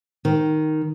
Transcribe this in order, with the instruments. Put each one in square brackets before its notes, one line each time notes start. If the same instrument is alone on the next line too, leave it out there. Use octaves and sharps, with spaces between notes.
[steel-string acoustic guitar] D#3